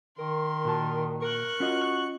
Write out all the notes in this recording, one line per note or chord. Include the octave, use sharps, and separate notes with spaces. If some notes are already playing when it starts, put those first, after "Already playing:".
D#3 A#4 C6
A#2 F#4 A5
A#4 C#6 F#6
C#4 F4 F#4 D#5